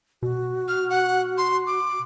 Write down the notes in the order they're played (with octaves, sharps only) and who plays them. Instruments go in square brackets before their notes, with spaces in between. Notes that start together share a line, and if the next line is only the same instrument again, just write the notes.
[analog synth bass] B2 [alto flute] F#4
[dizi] F6
F#5
C6
D6